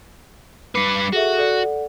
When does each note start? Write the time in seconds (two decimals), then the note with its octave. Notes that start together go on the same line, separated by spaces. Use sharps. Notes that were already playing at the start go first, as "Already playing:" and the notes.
0.75 G3 B4 D6 C7 C#7
1.13 F#4 G#4 A4 E5
1.37 A4 D5 F#5